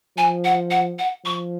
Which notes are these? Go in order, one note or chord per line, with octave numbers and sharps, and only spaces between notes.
F3 G#5
F#5
F#5
F#5
F3 C#6